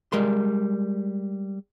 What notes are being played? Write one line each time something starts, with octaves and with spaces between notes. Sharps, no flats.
G3 G#3 A#4 C6